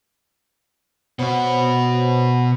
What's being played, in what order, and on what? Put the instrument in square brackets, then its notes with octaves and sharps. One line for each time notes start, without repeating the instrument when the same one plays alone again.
[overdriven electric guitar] B2 F#4 [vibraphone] C5 C#5 B5